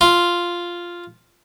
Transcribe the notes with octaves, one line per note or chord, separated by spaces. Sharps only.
F4